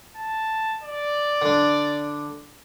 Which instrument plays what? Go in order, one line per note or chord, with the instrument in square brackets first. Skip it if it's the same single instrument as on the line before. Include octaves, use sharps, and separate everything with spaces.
[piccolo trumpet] A5
D5
[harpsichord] D3 D4